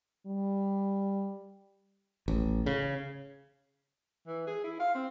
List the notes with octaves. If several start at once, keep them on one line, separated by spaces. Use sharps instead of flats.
G3
A1
C#3
E3
G#4
E4
F5
C4